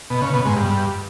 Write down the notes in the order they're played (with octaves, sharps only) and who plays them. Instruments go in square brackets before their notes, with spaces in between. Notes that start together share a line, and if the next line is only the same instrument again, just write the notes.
[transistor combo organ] B2
C#3
B2
G#2
G2